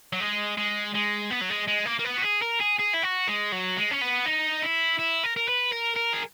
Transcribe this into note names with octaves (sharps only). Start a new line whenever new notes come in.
F#3
G#3
G#3
G#3
B3
F#3
G#3
G#3
A#3
A#3
B3
F#4
G#4
A#4
G#4
G#4
E4
F#4
G#3
F#3
G#3
C#4
B3
D#4
E4
E4
A#4
A#4
B4
A#4
A#4
G#4